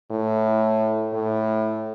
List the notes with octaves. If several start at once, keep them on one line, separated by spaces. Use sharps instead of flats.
A2
A2